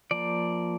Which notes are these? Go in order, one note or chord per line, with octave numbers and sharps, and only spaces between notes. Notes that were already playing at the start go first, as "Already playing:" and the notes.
F3 A#3 D5